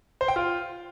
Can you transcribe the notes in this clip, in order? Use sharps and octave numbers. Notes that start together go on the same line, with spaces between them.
C5
G5
F4